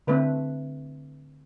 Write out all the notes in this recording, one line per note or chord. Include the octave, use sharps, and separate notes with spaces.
D3 A3 C4 B4